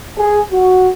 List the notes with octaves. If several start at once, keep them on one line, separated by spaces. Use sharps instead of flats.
G#4
F#4